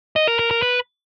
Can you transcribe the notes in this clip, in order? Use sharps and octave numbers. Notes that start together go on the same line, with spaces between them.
D#5
A#4
A#4
A#4
B4